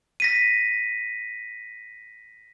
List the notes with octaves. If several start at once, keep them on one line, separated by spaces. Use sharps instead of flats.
A#6 B6 D#7